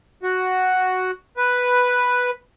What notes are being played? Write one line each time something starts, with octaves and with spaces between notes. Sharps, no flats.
F#4
B4